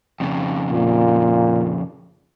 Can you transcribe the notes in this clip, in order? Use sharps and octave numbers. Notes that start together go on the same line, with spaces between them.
F2 C#3
A#2